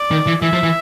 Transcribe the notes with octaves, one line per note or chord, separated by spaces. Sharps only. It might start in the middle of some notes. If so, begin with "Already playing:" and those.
Already playing: D5
D#3
E3
E3 E5
F3
E3